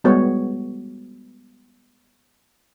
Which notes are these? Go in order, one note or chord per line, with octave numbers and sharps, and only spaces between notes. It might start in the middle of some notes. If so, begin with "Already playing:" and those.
G3 G#3 B3 F#4 C#5